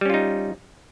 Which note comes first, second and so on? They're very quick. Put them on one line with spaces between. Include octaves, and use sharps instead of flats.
G3 C#4 F4 D#4